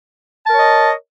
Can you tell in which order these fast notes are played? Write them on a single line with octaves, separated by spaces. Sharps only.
A5 A#4 C#5 D#5